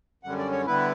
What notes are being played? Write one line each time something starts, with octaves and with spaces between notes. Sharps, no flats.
F#2 D3 G3 C#4 F#5
D5
C#5
D3 G3 B3 E4 B4